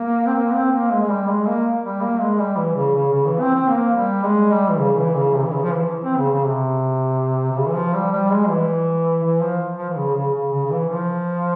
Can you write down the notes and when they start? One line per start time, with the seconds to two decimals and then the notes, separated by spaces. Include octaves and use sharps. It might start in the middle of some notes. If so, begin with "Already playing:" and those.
Already playing: A#3
0.27 C4
0.35 A#3
0.53 C4
0.72 A#3
0.91 G#3
1.01 G#3
1.09 G3
1.28 G#3
1.46 A#3
1.83 G3
2.01 A#3
2.21 G#3
2.39 G3
2.56 E3
2.75 C#3
2.94 C#3
3.12 C#3
3.26 E3
3.40 C4
3.54 C4
3.69 A#3
3.96 G3
4.24 G#3
4.51 G3
4.70 E3
4.78 C#3
4.98 E3
5.16 C#3
5.34 C3
5.45 E3
5.53 C#3
5.63 F3
5.72 E3
6.04 C4
6.17 C#3
6.31 C#3
6.45 C3
7.51 C3
7.56 C#3
7.66 E3
7.75 F3
7.94 G3
8.12 G3
8.31 G#3
8.49 E3
9.23 E3
9.41 F3
9.78 F3
9.89 E3
9.96 C#3
10.15 C#3
10.34 C#3
10.52 C#3
10.65 C#3
10.71 E3
10.89 F3